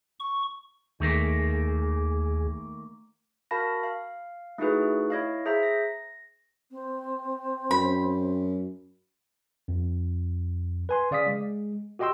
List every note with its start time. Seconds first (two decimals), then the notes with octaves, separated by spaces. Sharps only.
0.20 C#6
1.00 D#2 D#3 A3 A#3 G#4
3.51 F#4 A#4 F5 A5 B5 A#6
3.83 F5
4.58 A3 D#4 E4 F#4 G#4 B4
5.10 E4 C#5 D#5 F5
5.46 G#4 C5 E5 A#5
5.63 A#6
6.71 C4
7.71 F#2 B5
9.68 F2
10.89 B4 G#5 C6
11.11 C#3 D5 F5 D#6 B6
11.27 G#3
11.99 F#4 G4 D#5 G5 C6 E6